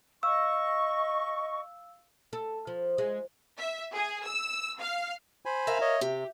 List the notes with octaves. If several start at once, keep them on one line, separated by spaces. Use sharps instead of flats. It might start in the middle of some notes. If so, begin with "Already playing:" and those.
D#5 F5 C#6 E6
A4
F3
G#3
E5
G#4
E6
F5
C5 G#5 B5
A#4 E5 F5
C#5 D#5
C3 G4